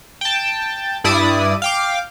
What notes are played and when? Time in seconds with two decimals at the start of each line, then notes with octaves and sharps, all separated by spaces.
0.21 G5 A5
1.04 G2 E4 D5 D#6
1.62 F5 G5 D6